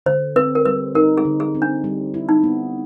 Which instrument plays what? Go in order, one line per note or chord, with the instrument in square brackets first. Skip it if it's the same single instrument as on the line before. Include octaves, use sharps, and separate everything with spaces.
[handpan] D3 [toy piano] C5
[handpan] C4 [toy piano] B4
[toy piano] A#4
[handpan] G3 [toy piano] B4
[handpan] D#4 [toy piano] A#4
[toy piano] G#4
[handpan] D3
[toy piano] G#4
[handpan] C4
[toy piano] D4
[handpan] G3
E4
[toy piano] D#4
[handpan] B3